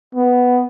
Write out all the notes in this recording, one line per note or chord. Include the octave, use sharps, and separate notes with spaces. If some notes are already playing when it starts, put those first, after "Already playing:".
B3